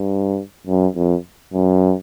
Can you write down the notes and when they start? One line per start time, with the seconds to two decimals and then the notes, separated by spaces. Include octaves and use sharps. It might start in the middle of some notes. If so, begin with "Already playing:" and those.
Already playing: G2
0.67 F#2
0.96 F2
1.53 F#2